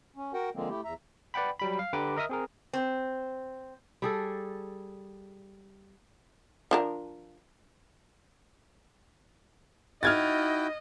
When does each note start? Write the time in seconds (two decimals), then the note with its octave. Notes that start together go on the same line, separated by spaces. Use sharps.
0.16 C#4
0.34 F#4 A#4 F#5 G5
0.55 D3 F3 G#3 A#3 C4
0.69 A3 E4 G4
0.84 E2 E5 A#5
1.34 B4 D5 F#5 G5 B5
1.59 F#3 G3 B5
1.79 F5
1.93 D3 G4 B4 A#5 D6
2.16 A#4 D#5 E5 D#6 F6
2.29 C4 G#4 A#4
2.73 C4
4.02 G3 G#4 A4
6.71 F3 D4 A#4
10.03 D#4 E4 F#4 D#5 G5 F6 G#6 A6